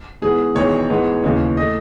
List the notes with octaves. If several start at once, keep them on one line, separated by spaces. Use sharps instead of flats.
G#2 E3 B3 G#4
E1 E2 D#3 G#3 C#5
G#2 E3 G#3 B3
D#2 C#3 E3 G#3 C#4
E3 A3 D#5